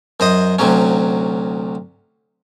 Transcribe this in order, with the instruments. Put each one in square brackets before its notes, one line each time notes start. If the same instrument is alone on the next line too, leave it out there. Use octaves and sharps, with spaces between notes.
[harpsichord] F#2 C5 D#5 D#6
D2 C3 F#3 C#4